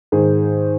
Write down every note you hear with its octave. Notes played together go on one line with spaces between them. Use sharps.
G#2 D#3 G#4